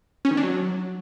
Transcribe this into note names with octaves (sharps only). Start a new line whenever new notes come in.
C#4
D#3
D4
F#3